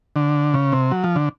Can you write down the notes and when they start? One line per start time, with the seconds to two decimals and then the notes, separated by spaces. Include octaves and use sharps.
0.16 D3
0.54 C#3
0.72 C3
0.91 F#3
1.04 F3
1.16 D3